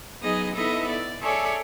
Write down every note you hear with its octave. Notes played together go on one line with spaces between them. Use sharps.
F#3 B3 D#4 G#4 D#5
B3 D#4 E4 A4 D#5 E5
D5
G#4 A4 C#5 D5 E5 G#5